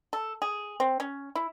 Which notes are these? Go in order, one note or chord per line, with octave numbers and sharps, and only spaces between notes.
A4
G#4
C4
C#4
E4